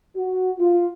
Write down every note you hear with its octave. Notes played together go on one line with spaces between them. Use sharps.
F#4
F4